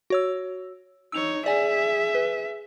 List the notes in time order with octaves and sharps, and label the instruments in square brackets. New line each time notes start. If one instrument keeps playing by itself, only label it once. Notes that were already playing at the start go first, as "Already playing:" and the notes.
[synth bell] F#4 C#5 E6
[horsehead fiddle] D#4 C#5 [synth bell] E6 F7
[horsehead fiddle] G#4 E5 [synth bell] D5 G#5
[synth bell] B4